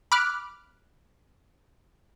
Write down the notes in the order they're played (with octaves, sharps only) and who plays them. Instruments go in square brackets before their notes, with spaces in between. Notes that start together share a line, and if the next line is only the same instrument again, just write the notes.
[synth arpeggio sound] B5 D6 F6 F#6